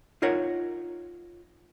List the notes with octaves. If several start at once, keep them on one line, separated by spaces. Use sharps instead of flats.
D#4 F4 A#4 C#5 F#5